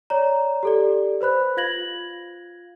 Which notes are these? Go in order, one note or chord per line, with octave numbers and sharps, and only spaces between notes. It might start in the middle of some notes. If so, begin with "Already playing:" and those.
C#5 D5 A#5
G4 A4 D5
B4 C5 B5 F#6
F4 F5 G#6 A#6 F#7